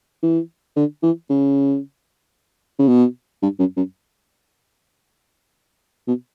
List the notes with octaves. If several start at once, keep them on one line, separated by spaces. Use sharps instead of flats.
E3
D3
E3
C#3
C#3
B2
G2
F#2
F#2
B2